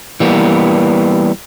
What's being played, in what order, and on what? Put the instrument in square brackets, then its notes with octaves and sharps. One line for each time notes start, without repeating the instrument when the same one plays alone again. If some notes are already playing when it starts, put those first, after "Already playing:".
[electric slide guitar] E3 G3 A#3 B3